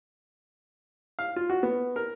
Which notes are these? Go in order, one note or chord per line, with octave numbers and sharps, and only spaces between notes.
F5
F4
F#4
B3
A#4